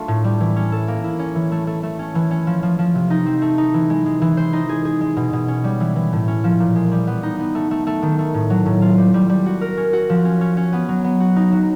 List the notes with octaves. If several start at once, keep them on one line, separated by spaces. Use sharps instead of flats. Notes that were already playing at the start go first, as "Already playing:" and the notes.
Already playing: A3 D4 F4
A2
G3
E3
C#4
A4
A#3
E4
C#4
E3
A3
A3
A3
C#4
E3
C#4
F3
F3
F3
C3
D#4
C4
A3
D#4
E3
G#3
G#3
E3
C5
D#4
G#4
G#4
G#3
B2
B2
C#4
G3
E3
E3
A2
C#4
F3
A#2
G#3
G3
B3
D#4
B3
A3
A3
A3
D#3
A3
A2
F#3
A2
F4
G3
G3
G3
F#4
A#4
C#4
F#4
F3
C#4
C#4
C#4
B3
F#3
B3
F#4
D#4
F#3